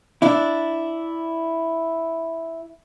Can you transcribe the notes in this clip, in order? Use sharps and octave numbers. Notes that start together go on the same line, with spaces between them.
D4 E4